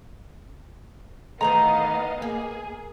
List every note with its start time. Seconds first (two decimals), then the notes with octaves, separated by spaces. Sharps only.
1.41 D#3 E3 A3 B3 D#5 F5 A#5
2.22 A#3 G#4